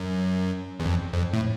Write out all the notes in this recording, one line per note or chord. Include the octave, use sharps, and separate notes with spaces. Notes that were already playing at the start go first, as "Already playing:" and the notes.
Already playing: F#2
E2
F2
F2
A2